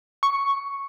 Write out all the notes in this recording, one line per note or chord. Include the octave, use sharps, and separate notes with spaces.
C#6